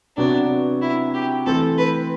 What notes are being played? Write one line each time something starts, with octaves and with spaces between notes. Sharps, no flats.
C3 F#3 B3 D4 F#4
E4
G4
E3 A3 C4 A4
B4